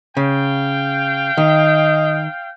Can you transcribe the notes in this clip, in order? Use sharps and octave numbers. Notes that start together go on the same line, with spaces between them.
C#3 F5 G5
D#3 D#5